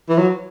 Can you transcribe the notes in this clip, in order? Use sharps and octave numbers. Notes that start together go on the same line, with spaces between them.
E3
F#3